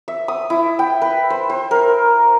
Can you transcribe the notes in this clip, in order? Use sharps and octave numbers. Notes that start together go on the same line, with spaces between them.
E5
D#6
E4
G5
B4
C5
C5
A#4